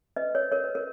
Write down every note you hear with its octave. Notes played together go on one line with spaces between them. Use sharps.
B4 D#5
A#4 C#5
A#4 C#5
B4
A#4